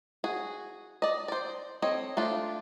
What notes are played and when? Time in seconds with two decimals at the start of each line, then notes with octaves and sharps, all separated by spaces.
0.24 F#4 G#4
1.02 D5 D#5
1.28 C5 D5
1.82 C4 A4 C#5 D#5
2.17 A3 D4 F4